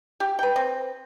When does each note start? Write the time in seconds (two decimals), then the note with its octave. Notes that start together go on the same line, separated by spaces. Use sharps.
0.20 G4
0.39 B4 G5
0.56 C4